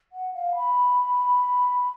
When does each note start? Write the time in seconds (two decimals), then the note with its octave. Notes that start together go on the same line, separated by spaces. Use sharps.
0.12 F#5
0.34 F5
0.55 B5